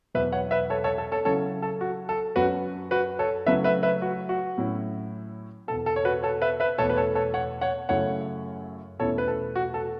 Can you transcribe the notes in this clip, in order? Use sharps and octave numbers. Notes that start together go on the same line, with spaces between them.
E2 B2 F#3 B3 B4 E5
C#5 F#5
B4 E5
A4 C#5
A4 C#5
A4
A4 C#5
C#3 F#3 C#4 E4 A4 C#5
A4
F#4
A4
F#2 F#3 C#4 F#4 B4
F#4 B4
A4 C#5
C#3 F#3 A3 C#4 E4 B4 E5
B4 E5
B4 E5
F#4
F#4
A2 F#3 C#4 E4
E2 B2 B3 A4
A4
C#5
F#4 B4
A4 C#5
B4 E5
B4 E5
E2 B2 A3 A4 C#5
B4
A4 C#5
A4 C#5
C#5 F#5
C#5 F#5
F#2 C#3 A3 C#4 E4 C#5 F#5
E2 B2 A3 C#4 E4 A4 C#5
B4
A4
F#4
A4